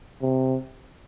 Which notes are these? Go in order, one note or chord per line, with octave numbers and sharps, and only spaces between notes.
C3